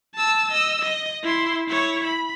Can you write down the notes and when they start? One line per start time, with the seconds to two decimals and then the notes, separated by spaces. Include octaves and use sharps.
0.15 A5 E6
0.51 D#5 E6
0.82 D#5
1.23 E4 C6
1.68 E4 C#5
2.04 B5